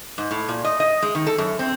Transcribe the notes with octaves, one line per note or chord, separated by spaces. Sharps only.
G#2
A2
A#2
D#5
D#5
G#3
D#3
A4
F#2
C4